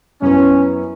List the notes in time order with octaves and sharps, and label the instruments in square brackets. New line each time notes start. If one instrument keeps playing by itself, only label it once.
[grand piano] F#2 E3 B3 [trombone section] C#4